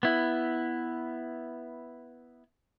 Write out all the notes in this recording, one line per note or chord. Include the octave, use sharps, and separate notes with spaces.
B3 E4